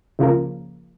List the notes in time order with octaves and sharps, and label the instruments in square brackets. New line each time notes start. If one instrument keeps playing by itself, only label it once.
[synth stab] C#2 C#3 F3 A#3